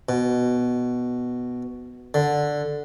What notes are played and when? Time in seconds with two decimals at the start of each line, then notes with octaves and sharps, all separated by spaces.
0.09 B2
2.14 D3